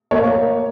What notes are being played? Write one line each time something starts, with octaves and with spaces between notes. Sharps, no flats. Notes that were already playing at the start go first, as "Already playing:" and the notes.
A#3 C#5